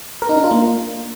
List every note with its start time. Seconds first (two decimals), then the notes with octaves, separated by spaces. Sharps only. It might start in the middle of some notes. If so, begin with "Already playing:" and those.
0.22 A#4
0.29 D#4
0.37 D4
0.44 F4
0.51 A#3